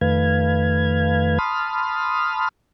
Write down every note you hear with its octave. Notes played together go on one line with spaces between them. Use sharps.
F2 D#3 A3 B4 F5 G#6
A5 B5 C6 D#6 F6